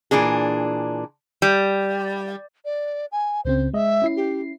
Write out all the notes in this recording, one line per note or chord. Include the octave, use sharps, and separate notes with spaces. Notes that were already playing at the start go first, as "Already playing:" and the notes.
A#2 E3 D4 G#4
G3
D5
G#5
C#2 C#3 C4 C5
G#3 D#5 E5
C#4 E4 C7
G4